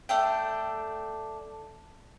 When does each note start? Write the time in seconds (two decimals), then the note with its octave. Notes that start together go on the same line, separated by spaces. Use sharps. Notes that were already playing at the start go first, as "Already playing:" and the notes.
0.09 A3 D4 G5